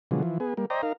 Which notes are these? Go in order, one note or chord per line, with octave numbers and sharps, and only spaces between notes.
B2 D3 F3 F#3 G#3
E3 F3
B3 G#4
G3 A#3
C5 D5 D#5 G5 A#5
D#4 A#4 F5